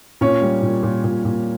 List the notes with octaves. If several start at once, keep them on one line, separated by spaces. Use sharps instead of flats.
A#2 C#4 C#5
G3
A#2
A#2
A#2
A#2